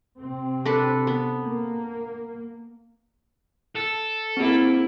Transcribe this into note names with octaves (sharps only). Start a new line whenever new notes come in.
C3 C4
D4 A4 B4
B3
A#3
A4
A#3 C4 E4 G#4